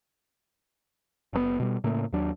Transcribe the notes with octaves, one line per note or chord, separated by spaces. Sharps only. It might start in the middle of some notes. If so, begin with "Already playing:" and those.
F#1 C3 B3
B2 G3
A2 C#3 A3 A#3
D#2 F#3 D4